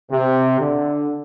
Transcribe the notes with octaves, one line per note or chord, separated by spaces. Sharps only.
C3
D3